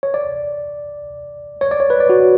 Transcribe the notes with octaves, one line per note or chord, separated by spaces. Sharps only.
C#5
D5
C#5
D5
C#5
B4
D5
F#4